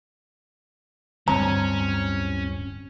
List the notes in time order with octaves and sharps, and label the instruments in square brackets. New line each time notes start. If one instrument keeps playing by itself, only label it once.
[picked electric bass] D1 G3 C4 [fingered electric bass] D2 G2 [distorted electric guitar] C#4 [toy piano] A#5